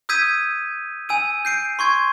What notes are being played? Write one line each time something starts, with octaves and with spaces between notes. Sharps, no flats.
D#6 E6 G6 G#6 B6 D#7
G#5 E6 D#7
G6 C7 D7
C6 C#6 G#6